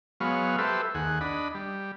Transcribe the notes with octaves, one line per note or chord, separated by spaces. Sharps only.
F#3 G#3 B3 C#5 F5
G4 A4 B4 C5 E5
D#2 G#4 F#5
D4 D#5 B5
G3